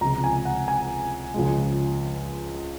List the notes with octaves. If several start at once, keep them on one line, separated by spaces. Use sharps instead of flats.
C#2 C3 F3 G#3 A#5
G#5
F#5
G#5
C#2 C#3 F3 G#3